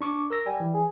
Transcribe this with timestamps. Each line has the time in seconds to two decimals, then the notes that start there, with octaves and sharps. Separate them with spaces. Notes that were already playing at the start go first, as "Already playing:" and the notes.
0.01 D4 C#6 D6
0.30 A#4 E6 A#6
0.46 G3 G#5
0.60 E3
0.74 G#4